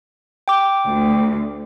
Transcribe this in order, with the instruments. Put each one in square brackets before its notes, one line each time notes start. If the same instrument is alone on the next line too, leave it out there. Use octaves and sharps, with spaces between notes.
[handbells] G5 D6
[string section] D2